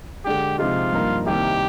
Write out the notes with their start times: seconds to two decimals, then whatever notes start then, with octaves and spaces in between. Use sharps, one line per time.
0.25 D3 G#3 D4 G4 G#4
0.59 C3 F3 G#3 D#4 F4 G4
0.93 G2 F3 A#3 D#4 A#4
1.26 C2 C3 D#3 A#3 G4